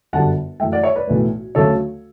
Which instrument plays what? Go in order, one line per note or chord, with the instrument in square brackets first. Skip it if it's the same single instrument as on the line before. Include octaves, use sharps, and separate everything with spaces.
[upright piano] G1 F#2 D3 G3 F#5 A5
F#2 E3 A3 E5 G5
D5 F#5
C#5 E5
B4 D5
B1 A2 E3 A3
D2 C#3 F#3 A3 A4 C#5